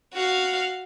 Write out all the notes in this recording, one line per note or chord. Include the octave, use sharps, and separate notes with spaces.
F#4 F5